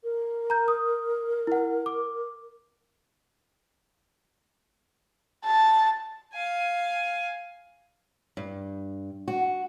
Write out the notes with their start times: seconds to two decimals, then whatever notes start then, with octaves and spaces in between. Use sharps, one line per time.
0.03 A#4
0.50 A#5 G6
0.68 D#6
1.47 E4 F#5
1.86 D6
5.45 A5
6.33 F5 G#5
8.37 G2
9.28 F#4